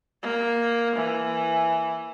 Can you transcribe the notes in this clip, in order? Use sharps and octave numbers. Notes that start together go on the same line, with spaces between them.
A#3
E3